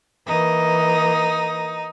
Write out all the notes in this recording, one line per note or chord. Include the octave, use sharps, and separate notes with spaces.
E3 A#3 D#4